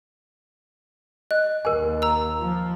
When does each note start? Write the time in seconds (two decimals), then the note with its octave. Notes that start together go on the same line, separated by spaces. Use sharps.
1.31 D#5 F#6
1.65 D#2 A#4 G#5
2.02 A#5 E6
2.40 F3